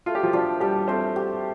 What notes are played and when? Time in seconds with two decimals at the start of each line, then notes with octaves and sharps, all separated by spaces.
0.06 A3 F4
0.15 G4
0.23 F3 F4
0.33 F3 D4 F4
0.60 G3 D4 G4
0.88 A3 C4 C5
1.16 G4